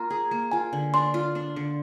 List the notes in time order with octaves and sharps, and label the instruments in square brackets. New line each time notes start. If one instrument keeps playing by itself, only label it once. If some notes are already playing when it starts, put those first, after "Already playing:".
Already playing: [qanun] A#3 F4 [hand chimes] A#5
[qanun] G#4
A#3
[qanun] F4 [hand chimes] G#5
[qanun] D3
[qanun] D4 [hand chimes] C6
[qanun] F4
D4
D3